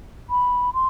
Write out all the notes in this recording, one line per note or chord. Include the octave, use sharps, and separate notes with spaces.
B5
C6